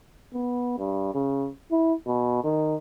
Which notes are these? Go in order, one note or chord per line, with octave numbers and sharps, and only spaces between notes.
B3
G2
C#3
E4
B2
D#3